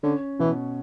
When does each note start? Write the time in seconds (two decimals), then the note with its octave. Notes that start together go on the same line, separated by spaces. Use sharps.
0.03 D3 C#4
0.39 B2 E3